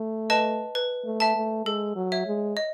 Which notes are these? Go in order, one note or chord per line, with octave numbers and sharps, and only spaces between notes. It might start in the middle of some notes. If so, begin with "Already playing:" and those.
Already playing: A3
B4 D#5 A5
B4
A3
E5 A5
A3
G#3 A4
F#3
C#5 E5
G#3
D#5